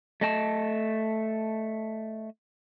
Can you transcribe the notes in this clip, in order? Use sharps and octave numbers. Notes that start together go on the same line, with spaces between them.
A3 D#5 A5